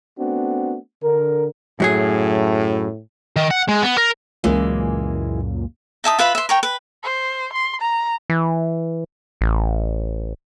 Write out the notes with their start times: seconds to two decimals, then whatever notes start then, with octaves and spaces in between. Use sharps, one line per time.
0.19 A3 B3 C4 D4 F#4
1.03 D3 A#4
1.80 F#2 A2 F#3 G#4
3.36 D#3
3.51 F#5
3.68 G#3
3.82 B3
3.98 A#4
4.44 C#2 F#2 A#2 E3 G#3 A#3
6.04 D#4 E5 A5 D#6
6.19 F4 B4 E5 B5
6.35 E5 C6
6.49 A#4 C#5 G5
6.63 B4
7.03 C5
7.53 C6
7.81 A#5
8.30 E3
9.41 A1